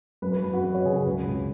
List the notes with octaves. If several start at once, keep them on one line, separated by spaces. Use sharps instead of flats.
F#2 B4
B4
F#2 B4
F#4
F#3 B4
C#5
C#3 G#4
G#4
C#2 B4
C#2